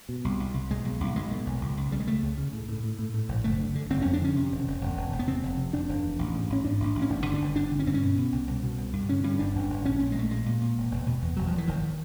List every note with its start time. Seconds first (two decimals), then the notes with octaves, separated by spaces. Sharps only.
0.09 B2
0.25 C2
0.40 C2
0.54 C2
0.70 B1 G#3
0.85 B1
1.00 B1
1.15 B1 G#3
1.31 A#2
1.46 B1
1.61 C#2
1.77 C#2
1.91 C#3 G3
2.00 G#3
2.07 C#3 A3
2.22 C#2
2.38 C#3
2.53 A2
2.69 A2
2.83 A2
2.99 A2
3.14 A2
3.29 A#1
3.44 F#1 A3
3.60 D3
3.75 D3
3.90 F#1 C4
4.02 F2 C#4
4.13 D4
4.21 D3 C#4
4.36 C3
4.52 E1
4.67 E1
4.81 E1
4.97 E1
5.12 E1
5.19 B3
5.27 C3 C4
5.43 F1
5.57 C3
5.73 F1 D4
5.88 F1
6.03 E2
6.19 A1
6.34 G#2
6.50 A1 C#4
6.64 G#2 D4
6.80 A1
6.95 A1
7.02 C#4
7.10 G1 D4
7.26 D3
7.34 D4
7.42 G1
7.56 G1 D4
7.71 D3
7.79 C#4
7.87 G2 C4
7.94 C#4
8.02 B2
8.18 B2
8.32 C2
8.47 C2
8.63 B2
8.78 C2
8.93 G2
9.09 D3 C#4
9.24 G2 C#4
9.39 G1 D4
9.55 G1
9.70 G1
9.85 A#1 C#4
9.97 A#2 C#4
10.12 G#3
10.15 A#1 A3
10.31 A#2 G#3
10.46 A#2
10.61 A#2
10.77 E1
10.91 E1
11.07 B2
11.22 E2
11.37 E1 F#3
11.47 F3
11.53 E1
11.58 E3
11.68 F#1 D#3